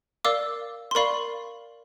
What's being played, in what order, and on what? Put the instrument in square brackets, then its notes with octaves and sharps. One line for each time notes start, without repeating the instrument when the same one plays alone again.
[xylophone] A#4 D5 F5 D6 E6
C6
A#4 D5 F5 B5 C#6